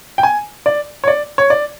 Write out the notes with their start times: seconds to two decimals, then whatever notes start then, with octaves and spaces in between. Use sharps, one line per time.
0.18 G5
0.23 G#5
0.66 D5
1.04 C#5
1.08 D5
1.38 C#5
1.50 D5